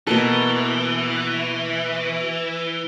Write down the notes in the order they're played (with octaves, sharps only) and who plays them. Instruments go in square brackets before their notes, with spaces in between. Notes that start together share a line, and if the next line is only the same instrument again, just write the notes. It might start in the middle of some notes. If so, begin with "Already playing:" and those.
[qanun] B2 A#3 A4 [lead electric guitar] E3